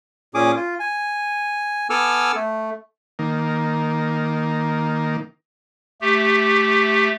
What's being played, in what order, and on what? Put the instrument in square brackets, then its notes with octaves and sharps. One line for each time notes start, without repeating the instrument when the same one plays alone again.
[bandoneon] A#2 C#4 G#4 D6 D#6
F4
G#5
B3 A4 G#5 D6 E6 F6
A3
[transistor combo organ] D#3 A#3
[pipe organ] A3 G4